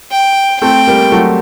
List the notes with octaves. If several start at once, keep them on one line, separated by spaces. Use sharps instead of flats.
G5
A3 C4 G5
G3 A#3
F#3 A3